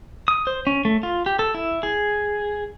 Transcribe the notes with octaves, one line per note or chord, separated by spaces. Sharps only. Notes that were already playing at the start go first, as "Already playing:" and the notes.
D#6
C5
C#4
A3
F4
G4
A4
E4
G#4